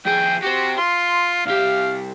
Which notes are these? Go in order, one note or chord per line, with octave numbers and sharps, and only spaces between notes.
F2 G#4 G5
F#4 G4 C5
F4 C6
C2 G4 F5